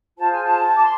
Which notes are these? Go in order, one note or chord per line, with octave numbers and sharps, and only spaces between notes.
F4 G#4 C5 A5
G#5
A5
D6
C6